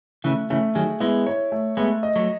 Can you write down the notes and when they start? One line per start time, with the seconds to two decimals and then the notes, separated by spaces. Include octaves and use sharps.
0.24 C#3 E3 A3
0.50 C#3 E3 A3
0.75 D#3 F#3 G#4
1.00 G#3 B3 E4
1.26 C#5
1.52 A3
1.77 G#3 A3 B3
2.03 D#5
2.16 F#3 A3